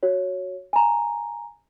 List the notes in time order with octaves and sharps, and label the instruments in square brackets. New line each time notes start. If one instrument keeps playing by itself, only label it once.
[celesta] F#4 C#5
G#5 A#5